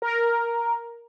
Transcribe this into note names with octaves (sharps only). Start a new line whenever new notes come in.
A#4